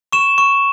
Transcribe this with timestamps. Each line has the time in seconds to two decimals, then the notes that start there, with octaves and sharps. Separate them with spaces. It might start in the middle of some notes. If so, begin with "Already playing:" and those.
0.12 C#6 E7
0.38 C#6